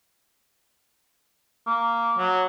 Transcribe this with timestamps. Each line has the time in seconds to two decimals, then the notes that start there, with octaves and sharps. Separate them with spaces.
1.67 A#3
2.18 F#3